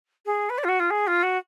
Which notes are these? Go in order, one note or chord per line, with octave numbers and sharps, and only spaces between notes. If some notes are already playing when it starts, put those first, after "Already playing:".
G#4
B4
D5
F4
F#4
F4
G#4
F4
F#4